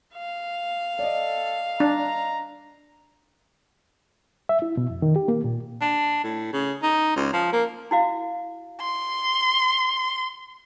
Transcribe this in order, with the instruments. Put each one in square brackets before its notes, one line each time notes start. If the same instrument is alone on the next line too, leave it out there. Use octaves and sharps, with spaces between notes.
[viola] F5
[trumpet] A4 [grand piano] D5 D#5
[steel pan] D4 [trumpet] A#5
[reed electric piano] E5
E4
B2
F2
D#3
G4
A#3
A#2
[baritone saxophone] D4
A2
C#3
D#4
C#2
F3
A#3
[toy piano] E4 F#4 F5
[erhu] C6